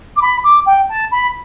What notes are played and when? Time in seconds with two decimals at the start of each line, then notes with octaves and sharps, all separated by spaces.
0.16 D6
0.21 B5
0.44 D6
0.66 G5
0.89 A5
1.11 B5